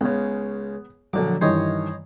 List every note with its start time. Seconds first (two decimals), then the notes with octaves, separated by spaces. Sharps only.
0.01 C#2 C#3 B3
1.13 A#1 D3 F#3 D6
1.41 G2 D#3 E3 C5 C#5 D#5